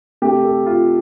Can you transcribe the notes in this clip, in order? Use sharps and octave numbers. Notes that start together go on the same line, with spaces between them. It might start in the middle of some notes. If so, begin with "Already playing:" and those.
C3 A3 G4
A4
F4